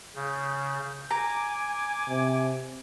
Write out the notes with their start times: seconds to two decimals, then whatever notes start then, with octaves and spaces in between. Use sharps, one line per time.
0.15 C#3 G6
1.11 G#5 A#5 D6
2.09 C3